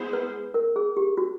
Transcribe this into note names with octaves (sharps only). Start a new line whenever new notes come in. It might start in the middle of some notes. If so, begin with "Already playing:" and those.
Already playing: G#3 B3 E4 G#4 C5
B4
A#4
G#4
G4
F#4